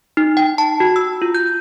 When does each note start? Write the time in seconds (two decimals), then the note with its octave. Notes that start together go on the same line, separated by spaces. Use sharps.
0.17 D#4
0.37 G5
0.58 A5
0.80 F#4
0.96 E6
1.22 F4
1.35 G6